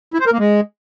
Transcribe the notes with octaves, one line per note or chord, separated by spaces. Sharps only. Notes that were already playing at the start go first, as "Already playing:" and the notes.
E4
C5
A#4
A#3
G#3